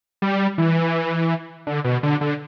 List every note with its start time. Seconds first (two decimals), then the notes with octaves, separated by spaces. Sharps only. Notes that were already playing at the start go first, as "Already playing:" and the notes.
0.22 G3
0.58 E3
1.67 D3
1.84 B2
2.03 D3
2.21 D3